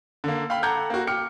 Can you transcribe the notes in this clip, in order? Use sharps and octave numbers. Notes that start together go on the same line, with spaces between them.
D3 A#3
F5 G5 B5
A4 F#5 A#5 D6 G6 G#6
A#3 F#4
G5 D6 F6 C#7